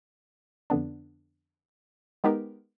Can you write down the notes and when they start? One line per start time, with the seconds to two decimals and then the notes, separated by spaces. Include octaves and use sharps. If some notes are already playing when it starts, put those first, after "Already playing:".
0.70 F2 D3 B3 D4
2.24 G#3 B3 D#4 G4 A#4